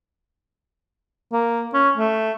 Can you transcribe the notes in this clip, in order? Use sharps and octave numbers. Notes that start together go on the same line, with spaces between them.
A#3
C#4
A3